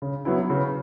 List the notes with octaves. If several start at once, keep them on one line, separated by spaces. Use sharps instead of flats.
C#3
F#3 B3 E4
C#3